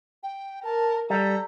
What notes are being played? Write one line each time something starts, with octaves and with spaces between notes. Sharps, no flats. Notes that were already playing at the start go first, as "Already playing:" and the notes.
G5
A#4 A5
G3 A4 A#5